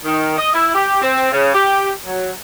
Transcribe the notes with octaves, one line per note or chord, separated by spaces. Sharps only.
D#3
D#5
E4
G4
C4
C#3
G4
F#3